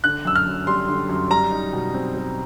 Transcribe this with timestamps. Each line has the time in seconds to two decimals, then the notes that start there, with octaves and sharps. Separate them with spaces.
0.04 D3 F#6
0.25 F#2 E6
0.36 F6
0.46 F#2
0.67 G3 C6
0.89 D3
1.09 F#2
1.30 G3 A#5
1.51 D#4
1.73 B2
1.94 C4
2.15 G3